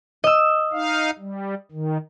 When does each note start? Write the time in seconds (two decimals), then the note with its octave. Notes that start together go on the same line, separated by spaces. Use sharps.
0.24 D#5 E6
0.73 D#4 F5
1.18 G3
1.71 D#3